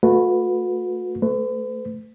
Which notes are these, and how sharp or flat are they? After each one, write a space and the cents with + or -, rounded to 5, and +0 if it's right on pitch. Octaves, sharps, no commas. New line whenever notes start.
A3 +0 F#4 -40 B4 +0
A3 -5 B4 +45